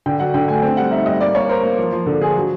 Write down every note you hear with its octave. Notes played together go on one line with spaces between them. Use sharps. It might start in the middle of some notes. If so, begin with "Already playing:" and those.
D3 G5
F#3 F#5
D3 G5
A3 G#5
C4 G5
G3 F#5
D#4 E5
G3 D#5
A#3 D5
A#3 C#5
A#4 C5
A#3
F3
F3
D3 A4
F3 G#4
F#3